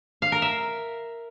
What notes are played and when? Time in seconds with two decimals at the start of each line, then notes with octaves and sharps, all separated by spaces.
0.22 F5
0.32 A#4
0.42 E5